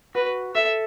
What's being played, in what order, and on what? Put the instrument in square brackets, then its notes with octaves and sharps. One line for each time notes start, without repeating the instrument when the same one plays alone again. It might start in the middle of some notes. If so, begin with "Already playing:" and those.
[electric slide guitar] F#4 [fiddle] B4
[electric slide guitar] A4 [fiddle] E5